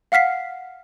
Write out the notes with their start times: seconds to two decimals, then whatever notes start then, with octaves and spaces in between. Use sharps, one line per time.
0.12 F5 F#5 F6 B6 C7